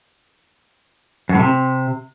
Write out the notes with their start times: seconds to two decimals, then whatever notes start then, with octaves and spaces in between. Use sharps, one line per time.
1.29 F#2
1.35 A2
1.40 C3